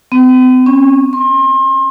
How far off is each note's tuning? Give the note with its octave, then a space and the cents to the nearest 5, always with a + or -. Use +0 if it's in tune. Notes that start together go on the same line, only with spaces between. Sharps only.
C4 -45
C#4 -20
C6 +35